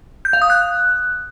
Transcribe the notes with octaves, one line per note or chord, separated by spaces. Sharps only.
G6
F5
D#6
F#6